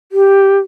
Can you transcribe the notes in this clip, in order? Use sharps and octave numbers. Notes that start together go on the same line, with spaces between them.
G4